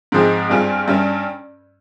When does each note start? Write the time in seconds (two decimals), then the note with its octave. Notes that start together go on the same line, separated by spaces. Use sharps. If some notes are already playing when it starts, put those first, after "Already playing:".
0.12 G#2 F3 G#3 C4
0.50 G2 G3 C4 F4 G#4
0.88 G2 G3 C#4